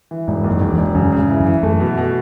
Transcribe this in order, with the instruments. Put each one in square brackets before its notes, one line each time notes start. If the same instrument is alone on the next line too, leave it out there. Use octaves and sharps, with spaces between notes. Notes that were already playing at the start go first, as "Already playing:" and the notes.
[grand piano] E3
[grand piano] E1 [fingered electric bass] G#2
[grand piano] D#2
[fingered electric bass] F#2
[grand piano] E1
[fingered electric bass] E2
[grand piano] E1
[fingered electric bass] F#2 [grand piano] C#3
[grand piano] C#3
[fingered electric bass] G#2
[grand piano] E3
[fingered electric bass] F#2
[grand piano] E3
[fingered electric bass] F#2 [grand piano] A3
[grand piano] B2
B2